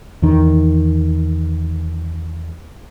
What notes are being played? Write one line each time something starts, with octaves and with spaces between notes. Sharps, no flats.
E2 D#3